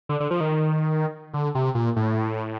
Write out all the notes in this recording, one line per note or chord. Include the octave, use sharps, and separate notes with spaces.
D3
D3
F3
D#3
D3
C3
A#2
A2